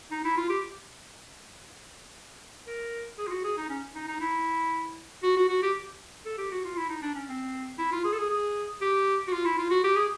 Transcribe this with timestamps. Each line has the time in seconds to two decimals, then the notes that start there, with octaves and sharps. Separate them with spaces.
0.11 D#4
0.24 E4
0.37 F4
0.49 G4
2.67 A#4
3.18 G#4
3.27 F4
3.31 F#4
3.44 G#4
3.57 D#4
3.69 C#4
3.95 D#4
4.08 D#4
4.20 E4
5.23 F#4
5.36 F#4
5.49 F#4
5.62 G4
6.25 A4
6.38 G4
6.52 F#4
6.64 F4
6.76 E4
6.89 D#4
7.02 D4
7.14 C#4
7.28 C4
7.78 E4
7.92 F4
8.04 G#4
8.13 A4
8.18 G#4
8.30 G#4
8.81 G4
9.27 F#4
9.33 F4
9.45 E4
9.58 F4
9.70 F#4
9.84 G4
9.96 G#4